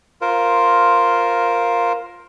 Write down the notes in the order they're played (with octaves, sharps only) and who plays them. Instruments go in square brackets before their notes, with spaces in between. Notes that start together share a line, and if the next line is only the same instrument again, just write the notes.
[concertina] F4 A#4 C5